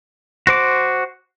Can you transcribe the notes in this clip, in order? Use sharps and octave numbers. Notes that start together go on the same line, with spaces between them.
F#4 C5 D6